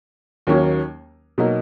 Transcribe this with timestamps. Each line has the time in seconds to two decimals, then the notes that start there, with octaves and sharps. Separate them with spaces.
0.47 D#2 D#3 F#3 A#3 C#4
1.38 B2 F#3 A#3 D#4